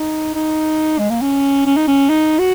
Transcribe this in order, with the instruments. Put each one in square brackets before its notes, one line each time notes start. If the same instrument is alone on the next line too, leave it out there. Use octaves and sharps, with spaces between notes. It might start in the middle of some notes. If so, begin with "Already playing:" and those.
Already playing: [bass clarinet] D#4
D#4
G#3
A#3
C#4
C#4
D#4
C#4
D#4
F#4